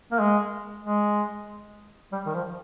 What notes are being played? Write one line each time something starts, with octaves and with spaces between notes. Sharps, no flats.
A#3
G#3
G#3
G3
D#3
F3